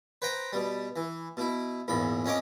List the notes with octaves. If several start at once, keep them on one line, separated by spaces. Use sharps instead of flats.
B4 C5 G5 A#5
B2 G3
E3
B2 E4
A#1 E2 G#2 B5
F2 C#4 C#5 D#5 D6